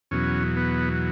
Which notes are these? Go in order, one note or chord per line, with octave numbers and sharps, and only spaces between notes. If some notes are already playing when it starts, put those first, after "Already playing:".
E2 B2 F#3 C#4
B3